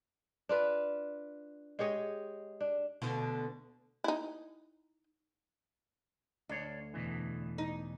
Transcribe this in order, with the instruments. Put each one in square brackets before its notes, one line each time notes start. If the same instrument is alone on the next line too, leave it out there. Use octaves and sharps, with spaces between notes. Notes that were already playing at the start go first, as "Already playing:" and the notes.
[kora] D4 F4 B4
G#3 G4 C#5 D#5
D4
[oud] D2 B2 D3
[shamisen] D#4 E4
[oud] D2 [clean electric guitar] D4 C#5
[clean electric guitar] E2 B2 E3
[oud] D#4